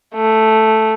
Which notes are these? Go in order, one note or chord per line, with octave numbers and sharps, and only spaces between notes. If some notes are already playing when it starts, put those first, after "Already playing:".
A3